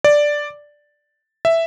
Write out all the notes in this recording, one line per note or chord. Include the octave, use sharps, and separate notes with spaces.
D5
E5